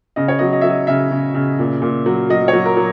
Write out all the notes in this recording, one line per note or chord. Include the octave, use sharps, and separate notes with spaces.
C#3 D#5
C#5
F#3 D#5
D#5
F#3 E5
D#5
C#3 E5
C#3
C#3
A#2
A#2
F#3
F#3 D#5
C#5
F#3
A#4
F#3